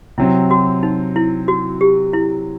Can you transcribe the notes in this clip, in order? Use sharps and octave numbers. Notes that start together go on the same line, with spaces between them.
C3 F#3 C4 E4
F#4
D#4
E4
F#4
G4
E4